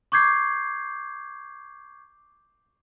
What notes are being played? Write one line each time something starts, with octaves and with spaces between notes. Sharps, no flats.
C#6 D6 G6 G#6 C7